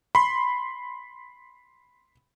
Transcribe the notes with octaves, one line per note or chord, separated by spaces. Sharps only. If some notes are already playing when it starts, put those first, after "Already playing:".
B5 C6